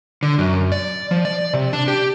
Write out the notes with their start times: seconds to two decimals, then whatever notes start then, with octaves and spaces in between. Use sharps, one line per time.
0.23 D3
0.38 F#2
0.72 D5
1.11 F3
1.25 D5
1.54 C3
1.73 D4
1.88 G4